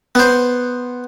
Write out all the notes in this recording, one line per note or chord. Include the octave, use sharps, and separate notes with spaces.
B3 C5